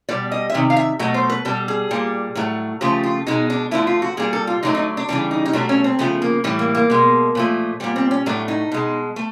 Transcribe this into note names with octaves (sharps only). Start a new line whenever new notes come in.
B2 G3 D5
D#5
E5
C3 D#3
F5
E5
B2 F#3 A3 D#5
C5
B4
B2 G3 A4
G#4
A#2 G3
A2 F#3 A3
C#3 F3 A3 G4
F4
B2 G#3 D#4
D4
D3 F3 A3 E4
F4
F#4
A#2 G3 G#4
A4
F4
D3 F#3 A3 D#4
D#4
D4
C#3 E3 G3 D4
D#4
D#4
B2 F#3 A3 D4
C#4
C4
C#3 F3 A3 B3
A#3
A2 E3 G3 A3
A#3
A#3
B2 G#3
A#2 F3 A3
A#2 G3 B3
C4
C#4
A2 F#3 A3 D4
D#4
B2 G#3
A3